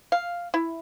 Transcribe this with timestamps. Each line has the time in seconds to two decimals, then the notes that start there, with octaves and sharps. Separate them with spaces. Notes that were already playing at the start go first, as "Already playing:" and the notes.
0.12 F5
0.54 E4